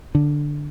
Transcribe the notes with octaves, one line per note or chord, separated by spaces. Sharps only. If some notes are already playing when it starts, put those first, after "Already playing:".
D3